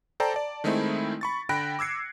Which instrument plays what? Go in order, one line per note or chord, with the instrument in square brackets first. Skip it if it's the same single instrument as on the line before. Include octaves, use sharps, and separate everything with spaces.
[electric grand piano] A4 C5 D5 G5 A5 A#5
D5 A5
D#3 G#3 A3 C4 D#4 E4
B5 C#6 A6
D3 G5 B5 F#6 A#6 D7
D6 E6 G#6 C7 C#7